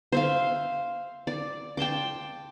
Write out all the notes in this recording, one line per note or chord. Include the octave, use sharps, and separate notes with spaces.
C5 E5 F5
D5
G5 A5 C6 D6